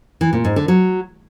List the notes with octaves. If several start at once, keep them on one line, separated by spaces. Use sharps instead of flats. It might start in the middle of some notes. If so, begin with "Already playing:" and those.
E3
A#2
G#2
D3
F#3